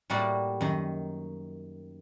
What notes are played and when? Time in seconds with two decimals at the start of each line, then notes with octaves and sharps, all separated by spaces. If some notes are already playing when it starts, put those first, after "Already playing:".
0.10 A2 G3 A#3 F#4 D5
0.61 F#2 D#3